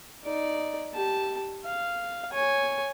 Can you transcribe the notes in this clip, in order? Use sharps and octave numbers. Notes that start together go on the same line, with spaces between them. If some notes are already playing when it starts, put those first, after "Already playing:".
D#4 D5
G4 A5
F5
C#5 G#5